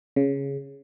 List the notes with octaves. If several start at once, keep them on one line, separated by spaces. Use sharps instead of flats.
C#3